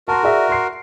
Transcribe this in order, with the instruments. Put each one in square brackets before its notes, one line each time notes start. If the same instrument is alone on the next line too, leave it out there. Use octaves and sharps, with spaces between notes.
[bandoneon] F#4 A#4 [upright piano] A5 C6
[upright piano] G#4 D5 E5
C6 C7